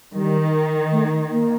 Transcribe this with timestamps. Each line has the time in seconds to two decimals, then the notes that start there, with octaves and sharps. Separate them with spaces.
0.13 D#3 G3
0.92 A3
1.31 A#3